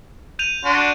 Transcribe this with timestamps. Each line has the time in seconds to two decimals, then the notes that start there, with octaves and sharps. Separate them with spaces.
0.39 G6 D#7 F7
0.65 D4 F#4 C6